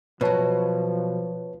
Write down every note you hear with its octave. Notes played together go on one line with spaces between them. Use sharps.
B2 F3 F#3 B4 C#5 A5